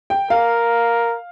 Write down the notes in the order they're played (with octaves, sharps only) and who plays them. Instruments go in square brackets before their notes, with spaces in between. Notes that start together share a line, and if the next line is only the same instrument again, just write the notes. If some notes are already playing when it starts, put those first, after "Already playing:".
[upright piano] G5
[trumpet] A#4 [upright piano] F5